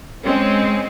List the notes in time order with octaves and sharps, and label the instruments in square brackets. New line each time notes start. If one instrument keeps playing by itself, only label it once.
[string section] G#3 C4 C#4